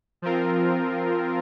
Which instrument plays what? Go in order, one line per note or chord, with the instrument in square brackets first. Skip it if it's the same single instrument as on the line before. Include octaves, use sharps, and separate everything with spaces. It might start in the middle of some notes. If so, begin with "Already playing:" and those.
[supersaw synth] F3 C4 F4 A#4